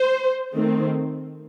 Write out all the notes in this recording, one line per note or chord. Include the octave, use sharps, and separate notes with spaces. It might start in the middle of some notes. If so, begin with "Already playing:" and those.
Already playing: C5
D#3 A3 C4